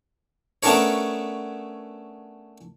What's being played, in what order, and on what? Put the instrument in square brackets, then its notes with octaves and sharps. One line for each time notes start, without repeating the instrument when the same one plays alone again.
[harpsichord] A3 B3 C#4 D4 A#4 C#5